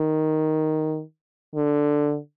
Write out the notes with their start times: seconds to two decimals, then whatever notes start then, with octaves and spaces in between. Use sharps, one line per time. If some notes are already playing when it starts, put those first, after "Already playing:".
Already playing: D#3
1.55 D3